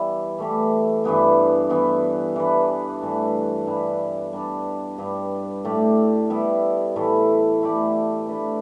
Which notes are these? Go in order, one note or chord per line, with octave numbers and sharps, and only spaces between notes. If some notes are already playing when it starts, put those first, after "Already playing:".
Already playing: E3 G3 B3 E4
E3 A3 G4
G2 E3 B3 E4
E3 B3 E4
E3 B3 D4 B4
G2 E3 A3
G2 G3 E4 B4
G3 D4 B4 D5
G2 G3 B3
A2 A3 G4 D5
G3 B3 E4
A2 E3 A3 E4
A3 E4 G4 D5
A3 D4 B4